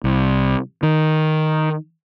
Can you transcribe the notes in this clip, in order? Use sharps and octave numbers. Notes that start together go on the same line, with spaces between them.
C2
D#3